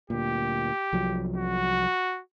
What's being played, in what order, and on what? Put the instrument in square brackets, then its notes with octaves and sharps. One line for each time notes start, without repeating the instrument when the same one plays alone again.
[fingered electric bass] D2 A#2 [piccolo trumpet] G4
[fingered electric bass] C2 F3 F#3
[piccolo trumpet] F#4